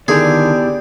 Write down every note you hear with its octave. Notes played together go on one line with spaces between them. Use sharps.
D3 D#3 B3 E4 G4 G#4 D5